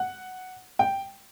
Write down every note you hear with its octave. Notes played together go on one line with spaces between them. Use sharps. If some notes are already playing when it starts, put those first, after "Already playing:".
Already playing: F#5
G5